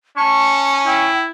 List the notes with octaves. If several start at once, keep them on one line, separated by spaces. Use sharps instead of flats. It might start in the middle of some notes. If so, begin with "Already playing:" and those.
C#4 A5 C#6
E4 G5